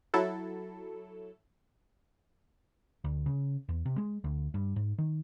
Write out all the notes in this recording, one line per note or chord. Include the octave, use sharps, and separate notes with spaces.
F#3 E4 A4
D2
C#3
E2
C3
G#3
D2
G2
G#2
D#3